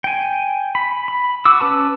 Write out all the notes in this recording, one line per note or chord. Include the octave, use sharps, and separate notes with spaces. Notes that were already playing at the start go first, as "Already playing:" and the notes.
G5 G#5
B5
B5
F#4 D6 E6
C#4 B4 A5